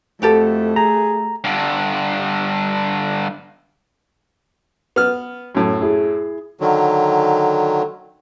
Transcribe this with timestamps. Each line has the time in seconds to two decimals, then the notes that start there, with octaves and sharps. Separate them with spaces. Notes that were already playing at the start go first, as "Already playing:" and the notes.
0.22 F2 A3 F#4 G4 A4
0.76 G#4 A#5
1.44 G2 D3
4.96 B3 F6
5.55 F#2 A2
5.80 E4 G#4
6.61 D3 D#3 F#3